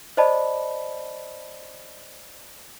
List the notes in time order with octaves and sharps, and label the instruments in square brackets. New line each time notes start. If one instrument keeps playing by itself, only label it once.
[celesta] C5 D5 D#5 A5 B5